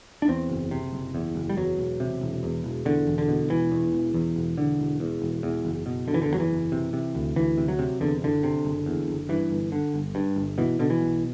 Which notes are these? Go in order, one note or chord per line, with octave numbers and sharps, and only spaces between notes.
D4
E2 C4
F#1
C3
F#1
E2
F#1
G3
E2 F#3
E1
C3
E1
E2
E1
E2 D3
E1
D3
B2
E1 E3
E2
E1
E2
E1
D3
E1
E2
E1
E2
F#1
B2
F#1 D3
E3
D3
E2
F#3
E3
F#1
C3
C3
D2
D2 E3
C3
F#3
C3
E2 D3
F#1 D3
C3
F#1
E2
F#1
G2 E3
G1
D3
G1
G2
G1
B2 E3
B2 D3
E3
B1